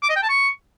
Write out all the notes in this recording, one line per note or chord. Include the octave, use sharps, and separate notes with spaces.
D6
D#5
G5
A5
C#6